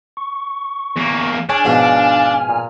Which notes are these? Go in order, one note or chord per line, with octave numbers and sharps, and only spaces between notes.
C#6
E2 A#3
D4 G#4 C#5 G#5 F6
G#2 B2 F3 F4
A#2